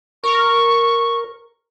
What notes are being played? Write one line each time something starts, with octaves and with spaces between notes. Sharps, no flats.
A#4 C#6